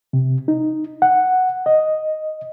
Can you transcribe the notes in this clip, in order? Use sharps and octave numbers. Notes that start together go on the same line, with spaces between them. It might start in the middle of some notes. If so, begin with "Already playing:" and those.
C3
D#4
F#5
D#5